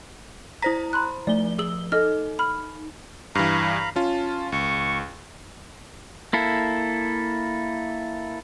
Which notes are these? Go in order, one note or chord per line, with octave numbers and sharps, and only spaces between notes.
E4 C5 A#5 A#6 B6
B5 C6 F#6
F3 A3 D5 G7
G#4 E6 F#7
D#4 A4 D#5 F6
B5 F6
G2 E3 F5 A#5 B5
C#4 F4 A5
C#2 C#6
A#3 E4 A4